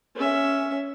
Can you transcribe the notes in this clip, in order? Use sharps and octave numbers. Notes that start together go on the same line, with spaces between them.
C#4 E5